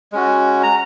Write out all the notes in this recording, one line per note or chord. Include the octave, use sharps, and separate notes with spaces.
G#3 C#4 F#4
A#5